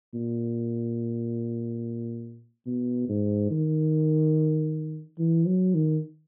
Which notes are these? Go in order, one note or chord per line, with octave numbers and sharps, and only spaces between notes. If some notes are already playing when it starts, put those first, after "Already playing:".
A#2
B2
G#2
D#3
E3
F#3
D#3